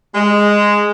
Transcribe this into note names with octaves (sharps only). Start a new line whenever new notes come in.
G#3